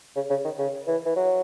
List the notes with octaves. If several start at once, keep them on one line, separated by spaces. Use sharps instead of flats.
C#3
C#3
D#3
C#3
E3
E3
F#3